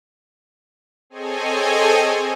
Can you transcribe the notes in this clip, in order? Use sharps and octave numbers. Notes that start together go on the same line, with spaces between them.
C4 G#4 A4 C#5 D#5 G#5